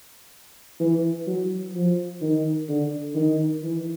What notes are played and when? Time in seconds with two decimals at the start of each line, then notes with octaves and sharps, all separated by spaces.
0.80 E3
1.27 F#3
1.74 F3
2.21 D#3
2.69 D3
3.15 D#3
3.63 E3